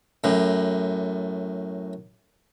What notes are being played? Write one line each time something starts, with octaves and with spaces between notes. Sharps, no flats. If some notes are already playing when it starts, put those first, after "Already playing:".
F#2 A2